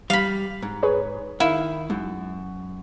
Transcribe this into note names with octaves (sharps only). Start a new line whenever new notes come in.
G3 F5 B5
G#2
G#4 B4 C#5
D#3 E4 F5
F#2 G#3